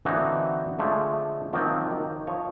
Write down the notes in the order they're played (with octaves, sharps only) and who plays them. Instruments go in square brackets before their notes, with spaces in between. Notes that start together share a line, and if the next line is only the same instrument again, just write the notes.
[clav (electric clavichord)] D3 E3 A#3 C4 D#4 F#4
D3 F3 G#3 A3
D#3 F3 F#3 A#3 C4 D#4
D#3
F3 C#5 D#5